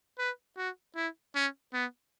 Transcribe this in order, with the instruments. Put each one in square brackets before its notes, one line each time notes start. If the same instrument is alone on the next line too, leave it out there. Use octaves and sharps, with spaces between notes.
[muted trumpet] B4
F#4
E4
C#4
B3